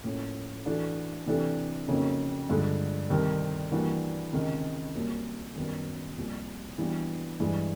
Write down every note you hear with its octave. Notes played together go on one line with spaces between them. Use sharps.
A2 F3 A#3 C#4
E3 A3 D4 F#4
C3 E3 A3 D4 G4
F2 C#3 F#3 A#3 D#4
G2 D3 F3 G#3
C2 C3 D#3 G3 C4
E3 G3 A#3 D4 F#4
C#2 C3 D#3
C2 A#2 F#3 A#3
F#2 D#3 G3 B3
C2 A#2 F3
E3 G3 B3 D4 F#4
G2 E3 G#3